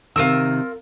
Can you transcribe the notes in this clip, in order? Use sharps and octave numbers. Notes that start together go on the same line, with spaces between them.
C3 D#3 F4 A#4 E6